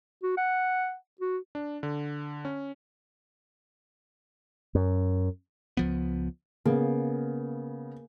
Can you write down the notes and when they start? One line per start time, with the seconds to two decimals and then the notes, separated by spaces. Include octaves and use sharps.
0.23 F#4
0.37 F#5
1.21 F#4
1.55 D4
1.83 D3
2.45 C#4
4.75 F#2
5.77 C#2 F3 B3
6.66 C#3 A#3 B3